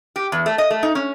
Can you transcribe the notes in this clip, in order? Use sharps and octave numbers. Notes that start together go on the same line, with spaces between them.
G4
E2
A3
D#5
A3
D#4
C#4